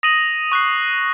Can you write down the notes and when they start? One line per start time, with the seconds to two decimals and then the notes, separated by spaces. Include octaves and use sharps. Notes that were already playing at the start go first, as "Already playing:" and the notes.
0.03 D#6 A#6 D#7 F#7
0.52 C#6 F#6 C7